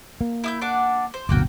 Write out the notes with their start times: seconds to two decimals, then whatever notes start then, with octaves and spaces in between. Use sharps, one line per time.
0.21 A#3
0.44 E4 D#6 G6
0.61 D4 F#5 D6
1.14 C5
1.29 D1 G1 B2 A#3 F#4 G5